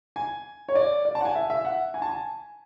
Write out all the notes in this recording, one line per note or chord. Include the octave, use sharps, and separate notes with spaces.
G#5
C#5
D5
D5
A5
F#5
G#5
E5
E5
F#5
G#5
A5
G#5